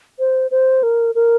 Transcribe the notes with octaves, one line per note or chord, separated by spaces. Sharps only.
C5
C5
A#4
A#4